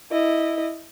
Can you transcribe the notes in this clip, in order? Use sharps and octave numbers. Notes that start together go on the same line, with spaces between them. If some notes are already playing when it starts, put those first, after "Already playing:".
E4 D#5